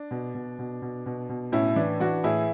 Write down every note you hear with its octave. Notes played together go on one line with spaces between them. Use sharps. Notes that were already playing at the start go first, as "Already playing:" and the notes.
Already playing: D4
B2
B2
B2
B2
B2
B2
A2 C#4 E4
E3 D4
E3 D4 F#4
A2 E4 G#4